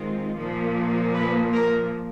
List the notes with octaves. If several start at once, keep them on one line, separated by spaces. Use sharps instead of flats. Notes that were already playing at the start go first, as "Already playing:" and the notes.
Already playing: D#3 G#3 C4 F4
A#2 F3 A#3
B4
A#4